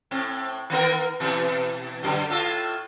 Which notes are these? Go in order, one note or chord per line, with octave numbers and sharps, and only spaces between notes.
A2 C4
D#3 B3 A#4
B2 E3
F#2 D3
A2 F4 A4